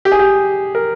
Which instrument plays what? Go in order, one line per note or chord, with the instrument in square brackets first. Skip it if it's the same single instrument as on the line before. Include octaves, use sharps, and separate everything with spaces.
[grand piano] G4
G#4
G4
A#4